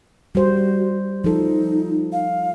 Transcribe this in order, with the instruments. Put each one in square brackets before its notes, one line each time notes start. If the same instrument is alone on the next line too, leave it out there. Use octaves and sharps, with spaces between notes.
[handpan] G3 C5 [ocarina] F#4
[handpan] F3 A4 [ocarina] D#4
[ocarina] F5